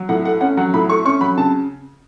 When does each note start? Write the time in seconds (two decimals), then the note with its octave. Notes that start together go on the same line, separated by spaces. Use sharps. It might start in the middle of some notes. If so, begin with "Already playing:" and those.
Already playing: F#3
0.09 A2 F#5
0.25 A3 F#5
0.41 C#4 F#5
0.57 F#3 F#5
0.73 A2 B5
0.89 A3 C#6
1.05 C#4 C#6
1.21 F#3 B5
1.37 C#3 A5